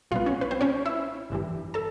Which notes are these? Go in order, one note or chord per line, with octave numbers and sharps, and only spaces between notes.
B1 A#2 G3 B3 F4 F5
C#4 C#5
B4
C4 C5
C#4 C#5
E4 E5
G1 G2 E3 G3
A4 A5